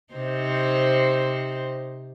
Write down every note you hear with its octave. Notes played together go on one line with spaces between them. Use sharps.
C3 D#4 C5